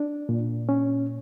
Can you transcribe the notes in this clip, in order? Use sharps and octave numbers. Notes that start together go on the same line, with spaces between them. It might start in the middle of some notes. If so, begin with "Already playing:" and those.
Already playing: D4
A#2
C#4